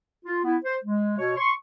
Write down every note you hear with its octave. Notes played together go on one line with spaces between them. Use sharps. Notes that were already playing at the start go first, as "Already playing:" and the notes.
F4
B3 E4
C5
G#3
B2 C#5
C6 C#6